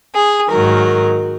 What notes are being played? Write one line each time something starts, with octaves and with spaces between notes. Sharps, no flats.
G#4
G#2 D#3 F#3 A#4